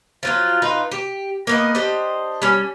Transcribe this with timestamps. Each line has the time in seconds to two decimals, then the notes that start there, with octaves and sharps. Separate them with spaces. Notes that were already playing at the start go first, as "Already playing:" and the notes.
0.23 F3 F#3 F4
0.62 D#4 F4 B4
0.92 G4
1.47 A#3 B3 D#5
1.75 D4 G4 C5 D#5
2.42 G3 C#4